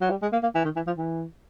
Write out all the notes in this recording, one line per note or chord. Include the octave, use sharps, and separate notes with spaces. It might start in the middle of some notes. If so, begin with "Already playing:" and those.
F#3
G3
G#3
A#3
A#3
E3
D#3
E3
F3
E3